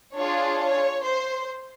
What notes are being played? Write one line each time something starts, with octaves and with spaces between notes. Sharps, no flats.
D4 F4 G#4 C#5
C#5
C5